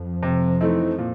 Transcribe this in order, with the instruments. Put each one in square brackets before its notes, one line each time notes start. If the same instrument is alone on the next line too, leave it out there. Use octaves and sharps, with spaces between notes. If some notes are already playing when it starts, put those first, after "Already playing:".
Already playing: [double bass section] F2 F3
[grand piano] C3
E3 A3 C4 D#4
A#2